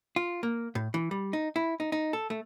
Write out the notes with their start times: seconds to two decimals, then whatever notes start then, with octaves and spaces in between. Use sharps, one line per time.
0.16 F4
0.43 A#3
0.75 A2
0.94 E3
1.11 G3
1.33 D#4
1.56 E4
1.80 D#4
1.92 D#4
2.13 A4
2.30 A3